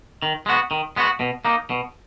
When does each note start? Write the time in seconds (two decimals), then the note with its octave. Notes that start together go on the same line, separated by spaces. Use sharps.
0.22 D#3
0.46 G#3 B3 F#4
0.71 D#3
0.96 G#3 B3 F#4
1.20 B2
1.45 A#3 D#4
1.70 B2